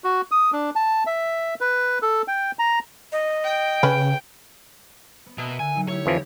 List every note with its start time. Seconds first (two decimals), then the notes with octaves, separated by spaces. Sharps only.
0.04 F#4
0.31 D#6
0.52 D4
0.76 A5
1.06 E5
1.61 B4
2.02 A4
2.28 G5
2.59 A#5
3.12 D#5
3.44 G5
3.83 C#3 C#4 B4
5.26 B3
5.38 B2 A#4 E5 F#5
5.59 D3 G#5
5.75 F#3 D#4
5.88 A3 E4 G4 C#5
6.06 F2 E3 F3